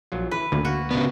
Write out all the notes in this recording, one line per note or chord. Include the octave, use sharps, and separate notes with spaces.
A#1 F#3 F4
E3 B4
D2 A2 D3 A#3
A#3 F#4
C#3 B3 D4 A#4